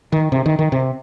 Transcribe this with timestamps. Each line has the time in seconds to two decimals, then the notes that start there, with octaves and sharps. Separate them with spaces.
0.12 D#3
0.32 C3
0.46 D#3
0.59 D#3
0.72 C3